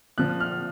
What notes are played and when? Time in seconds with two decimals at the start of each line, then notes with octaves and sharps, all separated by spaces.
0.18 A#2 F3 F#6
0.40 F6